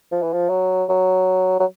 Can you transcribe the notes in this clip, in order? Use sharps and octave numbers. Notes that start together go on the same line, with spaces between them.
F3
E3
F3
F#3
F#3
F#3